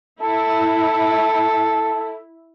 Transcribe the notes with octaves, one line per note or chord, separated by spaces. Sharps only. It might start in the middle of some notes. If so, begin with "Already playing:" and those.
E4 A4